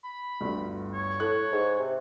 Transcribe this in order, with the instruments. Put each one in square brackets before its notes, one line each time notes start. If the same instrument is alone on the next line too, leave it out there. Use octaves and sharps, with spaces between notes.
[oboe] B5
[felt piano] G1 D2 G2
[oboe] C#5
[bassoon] A2 [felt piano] F#6
[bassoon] G#2
C3